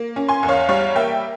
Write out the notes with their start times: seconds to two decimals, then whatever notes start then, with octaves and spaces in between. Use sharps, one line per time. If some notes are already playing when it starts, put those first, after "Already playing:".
Already playing: A#3
0.16 C#4
0.29 G#5 C6
0.43 E2
0.49 C#5 F5
0.69 G3 C#5 F5
0.96 A#3 E5 G5